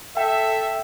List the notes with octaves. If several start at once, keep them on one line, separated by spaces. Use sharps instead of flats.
A4 E5 G5